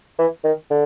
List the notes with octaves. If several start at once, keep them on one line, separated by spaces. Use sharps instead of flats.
E3
D#3
D3